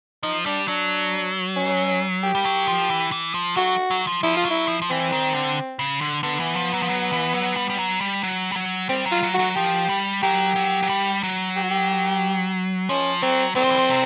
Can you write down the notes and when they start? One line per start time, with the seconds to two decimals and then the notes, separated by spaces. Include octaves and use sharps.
0.23 F3 D#4
0.46 G3 D4
0.68 F#3 D4
1.56 C#4
2.24 G4
2.35 G3
2.45 F#3
2.68 F3
2.90 E3
3.12 E3
3.34 F3
3.57 F#3 F#4
3.91 F#3
4.07 F3
4.23 F3 E4
4.37 F4
4.45 F#3
4.50 E4
4.68 F3
4.82 F3
4.90 E3 C4
5.12 D#3
5.34 D3
5.79 C#3
6.01 D3
6.23 D3 B3
6.40 E3
6.56 F3
6.74 F#3
6.82 F3
6.89 F#3
7.13 E3
7.34 F#3
7.56 G3
7.70 G3
7.79 F#3
8.01 G3
8.23 F#3
8.52 G3
8.56 F#3
8.89 G3 C4
9.06 F#3
9.11 F4
9.23 F#3
9.34 F#3 F#4
9.56 F3 G4
9.89 G3
10.23 F#3 G4
10.56 F#3
10.83 F#3
10.89 G3
11.23 F#3
11.56 G4
11.63 F#4
11.70 G4
12.89 F3 C#4
13.23 F#3 C4
13.56 F#3 C4
13.64 F3
13.71 E3
13.78 F3
13.89 C3